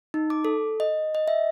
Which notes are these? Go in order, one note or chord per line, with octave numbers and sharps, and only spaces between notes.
D#4
D6
A4
D#5
D#5
E5